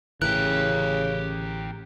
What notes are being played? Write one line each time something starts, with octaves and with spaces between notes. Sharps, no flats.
A1 C#3 E3 G4 A#4 F#6